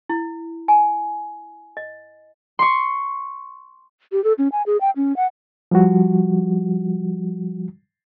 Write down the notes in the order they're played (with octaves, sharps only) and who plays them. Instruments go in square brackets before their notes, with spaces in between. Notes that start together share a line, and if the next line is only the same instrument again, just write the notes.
[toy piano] E4
G#5
D#5
[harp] C6 C#6
[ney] G4
A4
C#4
G#5
G#4
G5
C#4
F#5
[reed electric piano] F3 G3 F#4